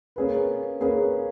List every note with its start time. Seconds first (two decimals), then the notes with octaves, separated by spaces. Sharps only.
0.16 A#3 C#4 G#4 B4
0.81 A#3 C#4 G#4 B4